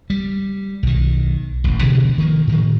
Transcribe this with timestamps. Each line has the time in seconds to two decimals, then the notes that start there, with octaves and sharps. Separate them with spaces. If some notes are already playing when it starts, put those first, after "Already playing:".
0.10 G3
0.83 B1 D#3
1.64 D#1 A1
1.81 G2 B2 D3 F3
2.18 D#3 F3 A#3
2.47 A2 D#3